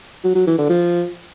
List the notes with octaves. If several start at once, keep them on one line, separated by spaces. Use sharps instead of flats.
F#3
F#3
E3
D3
F3